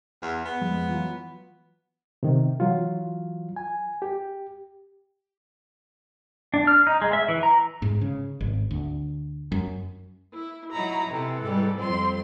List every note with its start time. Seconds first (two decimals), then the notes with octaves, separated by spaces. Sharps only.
0.22 E2
0.45 B3
0.61 F2 F3 G#3
0.89 E3 F#3 F4
2.23 C3 D#3
2.60 E3 F#3 F4
3.56 G#5
4.02 G4
6.54 D4
6.67 F6
6.87 D#4
7.02 G#3
7.13 E5
7.29 E3
7.43 A#5
7.82 G#2
8.01 C#3
8.41 G#1
8.71 D2
9.52 F#2
10.33 E4
10.73 F#3 D#4 E4 A#5 B5
11.10 C3 E3 A4
11.41 G#2 G3
11.77 F2 G3 C4 C6